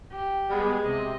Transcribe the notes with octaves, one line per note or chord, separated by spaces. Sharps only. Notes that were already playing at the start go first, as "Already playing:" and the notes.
G4
G3 G#3 B3 G#4
C3 D#5